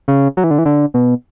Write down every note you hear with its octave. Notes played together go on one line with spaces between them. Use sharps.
C#3
F#3
E3
D3
E3
D3
B2